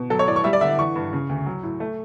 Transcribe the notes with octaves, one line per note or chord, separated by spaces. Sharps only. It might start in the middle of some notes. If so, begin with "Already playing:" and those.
Already playing: B2
F#3 A4
C#5
A2 D5
C#6
G3 E5
D5
D3 E5
E3 C#6
G2
C#3
D2
F#3
A2
A3